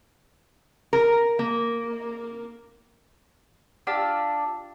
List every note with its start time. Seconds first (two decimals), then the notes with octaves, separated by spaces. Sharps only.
0.93 A#4
1.39 A#3
3.87 D4 F4 G4 E6